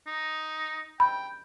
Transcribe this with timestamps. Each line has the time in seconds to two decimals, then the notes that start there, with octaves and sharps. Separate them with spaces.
0.07 D#4
1.00 G5 B5